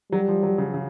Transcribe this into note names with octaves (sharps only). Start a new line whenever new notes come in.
F#3 G3
F3
F#3
C#3
C#3